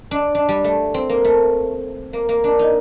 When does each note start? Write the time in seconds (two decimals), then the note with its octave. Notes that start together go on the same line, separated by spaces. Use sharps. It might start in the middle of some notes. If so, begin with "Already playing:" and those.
0.11 D4
0.35 D4
0.49 G3
0.64 A3
0.94 C4
1.09 A#3
1.25 A3
2.13 A#3
2.29 A#3
2.44 D4
2.59 D#4